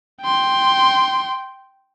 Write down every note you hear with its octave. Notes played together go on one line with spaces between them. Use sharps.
G5 C6